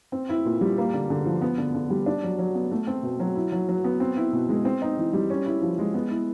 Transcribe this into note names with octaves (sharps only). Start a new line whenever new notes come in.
C4
E4
A#2
G3
A#3
D3
D3
F3
B3
D3
D3
G3
D4
F#3
F#3
B3
A3
C4
B2
F#3
E4
F#3
F#3
B3
C4
E4
B2
G#3
C4
D#4
E3
G3
C#4
E4
F3
G#3
B3
E4